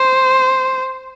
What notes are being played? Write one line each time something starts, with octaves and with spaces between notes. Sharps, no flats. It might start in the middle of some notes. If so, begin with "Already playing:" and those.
Already playing: C5